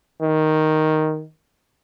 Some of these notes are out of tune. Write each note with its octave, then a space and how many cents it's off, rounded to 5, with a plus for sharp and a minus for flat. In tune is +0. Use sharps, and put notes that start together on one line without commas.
D#3 +0